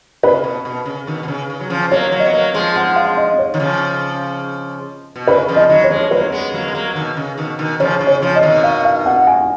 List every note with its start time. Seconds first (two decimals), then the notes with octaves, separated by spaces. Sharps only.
0.23 C#3 B4
0.44 B2
0.65 B2
0.86 C#3
1.07 B2 D#3
1.23 B2
1.28 C#3
1.50 C#3
1.60 F#3
1.70 C#3 F3
1.91 F#3 A#3 C#5
2.12 F#3 A#3
2.20 D#5
2.25 B3
2.33 F#3 A#3
2.54 F3 G#3
2.76 F#5
2.96 F5
3.17 D#5
3.38 C#5
3.54 D#3
3.60 C#3 F3
5.16 B2
5.27 C#3 B4
5.48 C#3 F3
5.56 D#5
5.69 D#3 F#3
5.84 C#5
5.90 F3 G#3
6.11 F#3 A#3 B4
6.32 G#3 B3
6.53 F#3 A#3
6.68 G#3
6.75 F#3 A#3
6.95 B2 D#3
7.17 C#3
7.38 B2 D#3
7.59 B2 D#3
7.80 C#3 F3 C#5
8.01 C#3
8.07 C#5
8.22 C#3 F3
8.36 D#5
8.43 B2 D#3
8.64 F5
8.85 F5
9.06 F#5
9.27 G#5